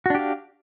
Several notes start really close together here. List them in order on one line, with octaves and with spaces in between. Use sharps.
F#4 D4 G4 F5